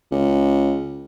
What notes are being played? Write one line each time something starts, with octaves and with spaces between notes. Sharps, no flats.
C#2